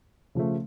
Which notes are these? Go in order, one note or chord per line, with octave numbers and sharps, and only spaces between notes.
C#3 F3 A3